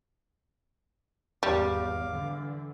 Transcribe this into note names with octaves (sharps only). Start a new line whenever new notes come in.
G#1 E2 G3 F5 D6
D3 E3